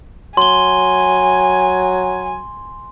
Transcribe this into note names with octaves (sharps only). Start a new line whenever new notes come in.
F#3 G#5 C6 G7